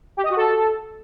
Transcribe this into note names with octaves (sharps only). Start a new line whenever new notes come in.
G4
D#5
F#4
A4